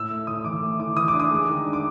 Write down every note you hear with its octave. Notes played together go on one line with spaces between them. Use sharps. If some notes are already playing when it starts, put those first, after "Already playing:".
Already playing: A2 E6
A3
A2 D#6
E3 D6
A3
E3 D6
E3 D#6
D6
D4
D#6
G#3
D#3
D4
D6